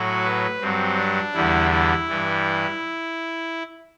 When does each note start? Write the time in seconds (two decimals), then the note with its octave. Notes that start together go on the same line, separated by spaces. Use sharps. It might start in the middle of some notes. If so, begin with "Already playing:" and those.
Already playing: A2 F#3 F#4
0.25 B4
0.61 G2 F#3 C4
0.98 D4
1.34 E2 D3 G3 E4
1.71 E4
2.08 G2 E3 G3